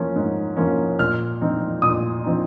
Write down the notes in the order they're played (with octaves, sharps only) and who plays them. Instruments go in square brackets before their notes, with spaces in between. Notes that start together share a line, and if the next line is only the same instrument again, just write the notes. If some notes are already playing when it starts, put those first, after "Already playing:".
Already playing: [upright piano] F3 A#3 C#4
G#2
F3 A#3 C#4
A#2 F6
F3 C4 D#4
A#2 D#6
F3 C4 D#4